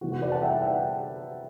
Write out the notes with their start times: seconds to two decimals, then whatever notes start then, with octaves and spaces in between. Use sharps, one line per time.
0.01 C3 E3 G3 B3 F#4
0.12 F#4
0.22 B4 D5
0.32 F#5 A5
0.42 E5 G5
0.61 F#5 A5